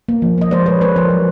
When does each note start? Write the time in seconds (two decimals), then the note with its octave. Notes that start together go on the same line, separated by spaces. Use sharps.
0.09 A#3
0.22 F3
0.38 A#3 D#5
0.51 G#3 C5 D5
0.66 G#3 B4 C#5
0.81 G#3 B4 C#5
0.96 F3 A#4 C5
1.10 F#3